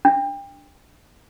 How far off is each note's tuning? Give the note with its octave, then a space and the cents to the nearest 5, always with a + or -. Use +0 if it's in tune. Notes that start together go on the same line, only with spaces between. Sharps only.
D4 -5